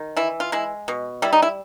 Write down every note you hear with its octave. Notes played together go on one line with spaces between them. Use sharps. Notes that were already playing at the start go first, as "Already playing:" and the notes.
Already playing: D#3
E3 E4
F4
G#3 E4
B2
G3 E4
D#4
E4